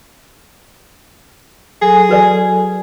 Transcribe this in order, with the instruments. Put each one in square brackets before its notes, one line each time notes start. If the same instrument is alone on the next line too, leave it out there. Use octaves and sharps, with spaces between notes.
[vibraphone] F#3 A4 G#5 [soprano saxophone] G#4
[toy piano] F#4 B4 D5